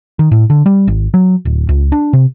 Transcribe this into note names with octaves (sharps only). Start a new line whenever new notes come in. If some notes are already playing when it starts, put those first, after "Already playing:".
D#3
A2
D3
G3
G#1
F#3
D1
C#2
D4
C3